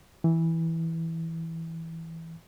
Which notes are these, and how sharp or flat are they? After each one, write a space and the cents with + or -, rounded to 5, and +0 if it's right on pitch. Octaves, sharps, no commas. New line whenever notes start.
E3 -10